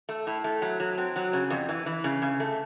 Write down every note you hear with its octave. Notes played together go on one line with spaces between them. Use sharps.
A3
A2
A3
F#3
F#3
C4
F#3
C#3
F2
E3
E3
C#3
C#3
A3